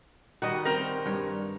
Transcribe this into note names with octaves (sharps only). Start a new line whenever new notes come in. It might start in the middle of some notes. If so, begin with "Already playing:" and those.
D#3 G3 F#4 D#5
C4 A#4 F5
G2 C#5